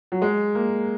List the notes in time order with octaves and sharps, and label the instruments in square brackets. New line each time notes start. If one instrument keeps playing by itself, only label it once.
[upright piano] F#3
G#3
A#3